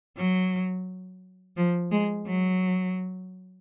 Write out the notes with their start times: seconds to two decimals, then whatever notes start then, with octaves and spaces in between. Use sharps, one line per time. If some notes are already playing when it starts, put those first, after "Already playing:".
0.17 F#3
1.57 F3
1.91 G#3
2.26 F#3